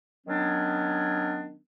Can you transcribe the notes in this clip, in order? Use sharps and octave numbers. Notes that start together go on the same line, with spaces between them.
D#3 F#3 B3 C#4 D4